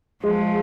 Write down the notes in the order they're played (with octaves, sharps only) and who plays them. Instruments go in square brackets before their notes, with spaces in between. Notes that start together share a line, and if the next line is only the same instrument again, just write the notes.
[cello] F3 [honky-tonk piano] G#3